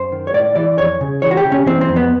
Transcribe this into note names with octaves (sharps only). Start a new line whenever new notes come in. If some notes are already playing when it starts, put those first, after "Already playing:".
Already playing: F#2 C5
D#3
C#5
A2 D5
E3 D5
F2 C#5
C#3
E3 C#5
F#4
G4
C#3
C#4
E3 C4
C4
F2
B3